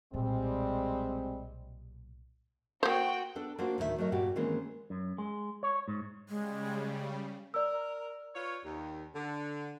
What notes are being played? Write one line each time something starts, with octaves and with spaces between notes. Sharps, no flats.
B1 A#2 G3 G#3 C4
A#3 F#4 C5 G5
B3 D4 A4
A#3 D4 F4 F#4 A#4 C5
D2 A2 D#3 A4 E5
F#3 A3 A#4 D#5
G2 A#2 F#4 G4
D#3 E3 G#3 A#3 C4 C#4
F#2
G#3
C#5
G#2
C#3 G3 G#3
A#4 D5 E6
F4 B4 C#5
D#2
D3